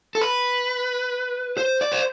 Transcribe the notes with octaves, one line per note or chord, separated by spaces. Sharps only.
A4
B4
C5
D5
C5